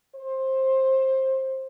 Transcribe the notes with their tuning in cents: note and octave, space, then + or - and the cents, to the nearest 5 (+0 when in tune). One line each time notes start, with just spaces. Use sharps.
C5 +20